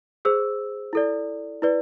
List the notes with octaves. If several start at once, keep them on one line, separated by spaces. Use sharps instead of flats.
G#4 C5 E6
E4 A4 D5
E4 B4 D5